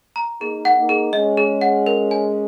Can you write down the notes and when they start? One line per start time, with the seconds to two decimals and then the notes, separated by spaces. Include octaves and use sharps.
0.16 A#5
0.41 A#3 D#4 G#4
0.65 F#5
0.77 A#3 D#4
0.89 G#4
1.13 G#3 C#4 D#5
1.37 G#4
1.61 F#5
1.86 A#4
2.11 G#5